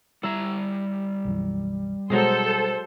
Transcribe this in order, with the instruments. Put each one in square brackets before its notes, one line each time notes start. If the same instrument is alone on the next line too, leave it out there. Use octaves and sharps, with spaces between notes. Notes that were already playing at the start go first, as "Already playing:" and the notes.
[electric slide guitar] G3 A#5 [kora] E4
[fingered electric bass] B1 F#2 E3
[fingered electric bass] B2 [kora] F#3 G#3 G#4 [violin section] A4 C5